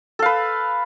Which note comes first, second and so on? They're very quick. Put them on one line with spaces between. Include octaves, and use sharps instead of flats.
A4 F5 B4